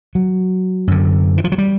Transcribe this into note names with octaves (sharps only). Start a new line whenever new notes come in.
F#3
F#2 D3
E3
F3
F#3
G3